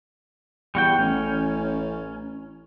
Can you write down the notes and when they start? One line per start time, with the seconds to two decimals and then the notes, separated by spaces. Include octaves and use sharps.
0.75 E2 G3 F#4 G5
0.98 A1 C#4